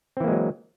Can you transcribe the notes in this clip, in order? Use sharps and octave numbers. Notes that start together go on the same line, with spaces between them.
E3 F#3 G#3 A#3 C4